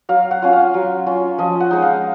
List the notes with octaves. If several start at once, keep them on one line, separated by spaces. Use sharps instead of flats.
F#3 F5
F#5
C#4 F4
F5
F#3
C#4 F4
F3 D#5
F#5
G#3 D#4
F5